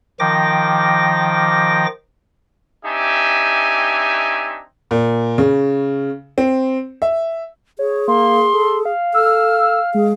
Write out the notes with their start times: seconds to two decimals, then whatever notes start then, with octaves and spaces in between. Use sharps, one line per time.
0.19 D#3 F3 G5 D6 A#6
2.85 C4 D4 D#4 G4 E5 G#5
4.91 A#2
5.38 C#3
6.38 C4
7.02 E5
7.79 G#4 C#5
8.08 A#3 C6
8.54 A4
8.85 F5
9.14 A4 E6 F6
9.94 G#3 G#4